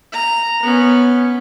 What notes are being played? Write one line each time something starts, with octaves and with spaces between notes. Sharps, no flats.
A#5
B3 C#4